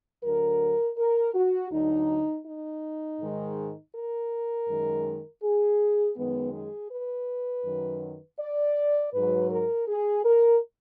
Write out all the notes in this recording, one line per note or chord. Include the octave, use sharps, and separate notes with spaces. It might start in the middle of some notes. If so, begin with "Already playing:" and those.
D2 D3 F#3 A#4
A#4
F#4
D2 D3 F#3 D#4
D#4
G#2 D#3 G#3
A#4
F#2 D#3 G#3
G#4
F#2 D#3 G#3 B3
G#4
B4
F#2 D#3 F#3
D5
G#2 F#3 B4
A#4
G#4
A#4